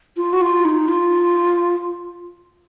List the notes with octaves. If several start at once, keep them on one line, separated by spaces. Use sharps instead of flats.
F4
F#4
F4
D#4
F4